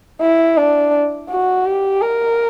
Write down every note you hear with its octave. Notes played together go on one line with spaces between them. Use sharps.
E4
D4
F#4
G4
A#4